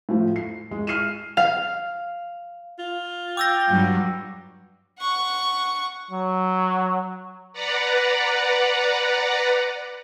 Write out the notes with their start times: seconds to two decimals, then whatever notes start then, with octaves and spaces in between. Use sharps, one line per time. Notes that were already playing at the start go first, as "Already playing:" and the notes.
0.09 A2 F3
0.36 C7
0.71 G#3
0.87 F6 C7 D#7 E7
1.37 F5
2.79 F4
3.37 G5 D6 E6 A#6
3.68 G2 F#3 G3
4.99 F#5 C#6
6.11 F#3
7.53 B4 D5 F#5 A#5